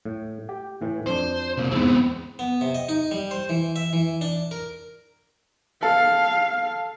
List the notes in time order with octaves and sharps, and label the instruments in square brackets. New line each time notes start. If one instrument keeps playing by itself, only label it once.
[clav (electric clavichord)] A2
G4 G5
A2 E3
[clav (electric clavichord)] F2 D4 [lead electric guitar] C5
[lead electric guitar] C3 A#3
[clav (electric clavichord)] E2 G#2 [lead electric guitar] B3 C4
[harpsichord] B3
C3
D#5
D#4
G3
C5
E3
E5
E3
D4
A#4
[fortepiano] A4 [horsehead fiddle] F5